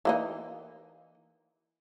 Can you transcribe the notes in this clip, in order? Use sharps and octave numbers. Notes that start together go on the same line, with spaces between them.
E3 A#3 D#4